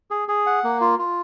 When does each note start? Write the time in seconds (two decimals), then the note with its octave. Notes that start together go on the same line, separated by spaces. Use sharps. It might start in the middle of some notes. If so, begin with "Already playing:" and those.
0.11 G#4
0.28 G#4
0.46 F#5
0.64 A#3
0.81 F4
0.99 F4